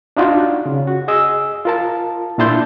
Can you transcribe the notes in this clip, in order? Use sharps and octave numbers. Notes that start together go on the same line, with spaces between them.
D4 D#4 F4 F#4
C#3
F#4
G#4 D#5 E6
F4 A#4 A5
A#2 D4 E4 A5 C6 G6